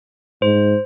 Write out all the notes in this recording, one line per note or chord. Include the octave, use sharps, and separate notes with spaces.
G#2 C5